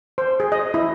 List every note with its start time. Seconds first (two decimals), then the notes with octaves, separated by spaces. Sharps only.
0.18 C5
0.40 G#4
0.52 D#5
0.74 E4